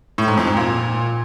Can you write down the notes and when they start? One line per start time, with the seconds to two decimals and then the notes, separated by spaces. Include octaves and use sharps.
0.18 A2
0.28 G#2
0.37 F2
0.47 G#2
0.57 A#2